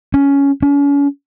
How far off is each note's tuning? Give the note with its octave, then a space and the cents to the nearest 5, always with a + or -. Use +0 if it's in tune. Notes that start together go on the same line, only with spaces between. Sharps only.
C#4 +10
C#4 +40